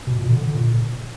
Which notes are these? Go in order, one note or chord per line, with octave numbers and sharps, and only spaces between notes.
B2
A#2
D3
D3
A#2